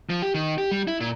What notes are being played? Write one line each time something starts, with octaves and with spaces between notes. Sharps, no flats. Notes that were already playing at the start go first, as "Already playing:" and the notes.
F3
G4
D#3
G4
G3
E4
A#2